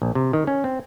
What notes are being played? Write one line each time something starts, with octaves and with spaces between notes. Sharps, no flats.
A#1
C3
D#3
C#4
C4